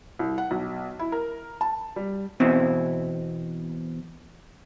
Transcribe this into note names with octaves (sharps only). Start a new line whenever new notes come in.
C2
F#5
B1
E4
A#4
A5
G3
E2 B2 C4 E4